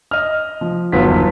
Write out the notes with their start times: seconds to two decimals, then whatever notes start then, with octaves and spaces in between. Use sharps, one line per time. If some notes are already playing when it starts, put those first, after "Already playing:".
0.11 D#5 F6
0.61 F3
0.92 G1 E2 D#3 F#3 F4 B6